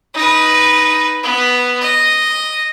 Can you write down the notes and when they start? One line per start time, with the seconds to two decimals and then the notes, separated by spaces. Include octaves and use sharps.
0.14 D#4 B4
1.23 B3
1.81 D#5